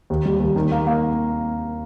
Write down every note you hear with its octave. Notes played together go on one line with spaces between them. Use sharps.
D#2
G3
D#2
D#3
A#3
A#3